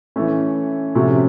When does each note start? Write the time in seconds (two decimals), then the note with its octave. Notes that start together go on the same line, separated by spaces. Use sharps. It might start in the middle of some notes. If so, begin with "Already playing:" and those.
0.16 E3 A3 C#4
0.95 C3 F3 A3 C#4 F#4